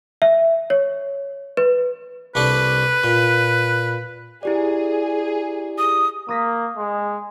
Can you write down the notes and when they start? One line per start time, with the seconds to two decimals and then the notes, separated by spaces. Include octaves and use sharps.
0.22 E5
0.70 C#5
1.57 B4
2.35 C2 D4 A4 B4
3.04 A#2
4.43 E4 G4 G#4 D5
5.78 D#6
6.29 A#3 D#6 A#6 B6
6.77 G#3